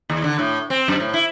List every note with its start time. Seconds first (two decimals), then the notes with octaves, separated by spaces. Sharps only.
0.10 D#2
0.24 D3
0.39 A2
0.70 C4
0.88 F#2
1.00 A2
1.14 E4